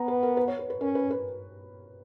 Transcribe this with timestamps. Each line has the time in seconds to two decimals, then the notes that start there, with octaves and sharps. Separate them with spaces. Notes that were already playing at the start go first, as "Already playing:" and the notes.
Already playing: B3 A#5
0.08 B4
0.23 A#4
0.37 B4
0.48 C#5
0.59 B4
0.70 B4
0.81 C#4 A#4
0.95 B4
1.11 B4